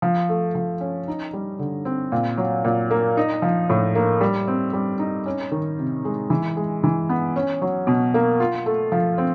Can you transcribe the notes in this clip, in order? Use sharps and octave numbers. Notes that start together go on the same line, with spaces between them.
F3
A3
F3
C#4
D#4
G3
D3
C4
A#2
F#3
A#2
A#3
D#4
F3
A2
A#3
G3
C4
G3
D#4
C#4
D#3
C3
G#3
E3
G#3
E3
B3
C#4
F#3
B2
A#3
F4
A3
F3
C4